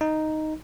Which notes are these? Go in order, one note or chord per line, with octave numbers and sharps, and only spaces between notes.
D#4